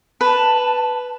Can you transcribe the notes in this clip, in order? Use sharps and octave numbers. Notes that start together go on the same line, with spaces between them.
B4 A5